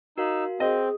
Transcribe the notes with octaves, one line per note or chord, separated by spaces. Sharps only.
D#4 F#4 A#4 F5 E6
C4 G#4 D#5